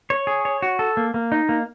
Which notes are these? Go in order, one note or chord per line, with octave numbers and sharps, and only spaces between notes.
C#5
G#4
C#5
F#4
A4
A#3
A#3
D#4
A#3